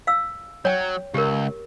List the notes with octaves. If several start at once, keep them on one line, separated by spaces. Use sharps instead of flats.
F5 E6
F#3 C#5 G5
C#2 G4 A#4